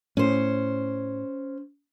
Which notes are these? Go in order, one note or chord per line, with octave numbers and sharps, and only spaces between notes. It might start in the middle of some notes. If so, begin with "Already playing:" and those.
A2 C#4 C5